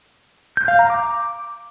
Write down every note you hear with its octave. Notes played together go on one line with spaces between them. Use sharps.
G6
F5
A#5
D6